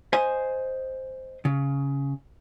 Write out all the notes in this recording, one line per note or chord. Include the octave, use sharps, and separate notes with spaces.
C5 D#5 G#5
C#3